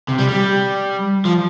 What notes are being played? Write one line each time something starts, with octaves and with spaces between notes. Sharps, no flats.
C3
G3
G3
F3